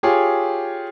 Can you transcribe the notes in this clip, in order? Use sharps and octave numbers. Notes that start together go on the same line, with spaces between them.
F4 G4 G#4 C#5